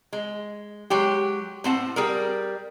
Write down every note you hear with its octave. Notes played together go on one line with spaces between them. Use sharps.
G#3
F#3 G#3 G4
A2 C4 F#5 A5
G3 G#4 A#4